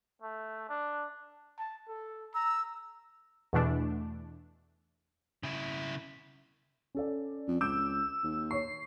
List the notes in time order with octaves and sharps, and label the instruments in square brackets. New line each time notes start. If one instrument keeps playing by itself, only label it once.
[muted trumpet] A3
D4
[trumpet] A5
A4
[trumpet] A#5 [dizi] E6
[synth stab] E2 B2 E3 A3 D4
[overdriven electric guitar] C#3 E4
[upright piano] C#4 A4 D5
[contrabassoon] F2
[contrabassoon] C#2 [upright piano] D6 G6 D7 [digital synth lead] E6
[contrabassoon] D#2
[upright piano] C#5 C#6 [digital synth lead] C7